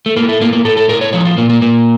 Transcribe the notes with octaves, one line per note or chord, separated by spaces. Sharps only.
A3
A2 A#3
A3
A2 A#3
A#3
A2 A4
A4
A2 A#4
C#5
F3 C#5
F4
A#2 A#3
A#3
A#2 A#3